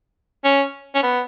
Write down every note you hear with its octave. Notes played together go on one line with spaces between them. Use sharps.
C#4
C#4
B3